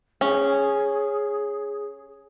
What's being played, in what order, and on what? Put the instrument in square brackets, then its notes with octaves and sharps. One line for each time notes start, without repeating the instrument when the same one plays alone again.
[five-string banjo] C#4 [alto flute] G#4